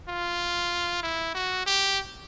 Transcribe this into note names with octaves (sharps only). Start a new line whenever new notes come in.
F4
E4
F#4
G4